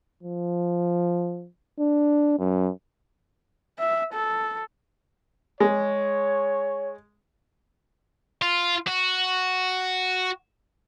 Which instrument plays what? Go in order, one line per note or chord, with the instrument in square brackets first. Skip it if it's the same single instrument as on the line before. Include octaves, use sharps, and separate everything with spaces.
[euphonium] F3
D4
F#2
[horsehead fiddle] E5
A4
[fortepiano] G#3 [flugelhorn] C#5
[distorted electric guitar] F4
F#4